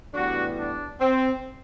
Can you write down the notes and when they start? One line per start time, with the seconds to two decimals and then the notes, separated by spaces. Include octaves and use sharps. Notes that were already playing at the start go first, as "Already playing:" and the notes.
0.14 A2 E3 G3 B3 D4 F#4
0.57 D4
1.00 C4